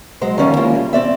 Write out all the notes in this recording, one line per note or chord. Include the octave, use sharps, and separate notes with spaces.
F#3 G#3 C5
D#3 F3 G3 C#4 E5 F5
G#3 A#3 E4 F4
G3
C4 D5 E5